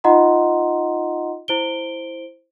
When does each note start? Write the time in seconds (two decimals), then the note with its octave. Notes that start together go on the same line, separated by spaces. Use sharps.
0.04 D#4 F4 D#5 F#5 A#5 C6
1.48 E4 C5 D7 G7